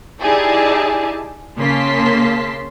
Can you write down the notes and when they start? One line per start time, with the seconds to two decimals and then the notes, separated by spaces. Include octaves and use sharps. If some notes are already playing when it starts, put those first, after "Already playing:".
0.22 D#4 E4 G4 G#4 D5 A5
1.59 C#3 A#3 A5 C6 B6